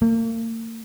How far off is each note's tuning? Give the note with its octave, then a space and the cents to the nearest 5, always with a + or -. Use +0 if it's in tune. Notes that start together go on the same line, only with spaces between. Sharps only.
A#3 -40